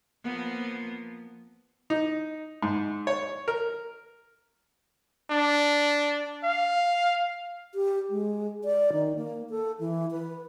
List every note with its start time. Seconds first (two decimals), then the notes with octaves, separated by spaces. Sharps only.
0.24 F3 A#3 B3
1.90 D#4
2.63 G#2
3.07 C#5
3.48 A#4
5.30 D4
6.43 F5
7.75 G4
8.10 G#3
8.64 D5
8.93 D#3
9.16 A#3
9.50 A4
9.79 E3
10.11 B4